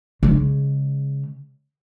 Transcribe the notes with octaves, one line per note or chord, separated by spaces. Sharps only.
C#3 G#3